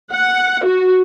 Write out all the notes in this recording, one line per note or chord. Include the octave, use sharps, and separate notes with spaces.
F#5
F#4